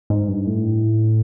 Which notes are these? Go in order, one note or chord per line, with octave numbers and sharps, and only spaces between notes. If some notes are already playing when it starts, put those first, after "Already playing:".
G#2
G2
A2